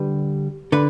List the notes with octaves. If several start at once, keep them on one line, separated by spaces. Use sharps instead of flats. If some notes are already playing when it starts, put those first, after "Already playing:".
Already playing: D3 G3 B4
D3 B4